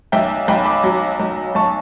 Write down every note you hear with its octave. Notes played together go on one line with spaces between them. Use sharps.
B1 E5 G5
B1 G5 B5
B5 D6
F#3
B1
B1 A5 C#6